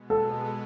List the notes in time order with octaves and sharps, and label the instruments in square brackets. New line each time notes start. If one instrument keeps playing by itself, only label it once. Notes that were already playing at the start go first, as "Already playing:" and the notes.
Already playing: [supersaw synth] B2 G#3 B3
[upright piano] A4